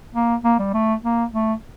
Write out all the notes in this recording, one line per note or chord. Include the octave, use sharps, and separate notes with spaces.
A#3
A#3
G3
A3
A#3
A3